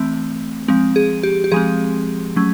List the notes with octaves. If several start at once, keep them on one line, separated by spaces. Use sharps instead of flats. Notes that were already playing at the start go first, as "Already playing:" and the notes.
Already playing: E3 A3 C4
F3 G#3 C4
G#4
G4
G4
F3 G#3 C4 G#4
F#3 A3 C#4